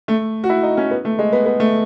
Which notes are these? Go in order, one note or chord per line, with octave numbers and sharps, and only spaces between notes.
A3
F#4
E4
D#4
C#4
B3
A3
G#3
B3
B3
A3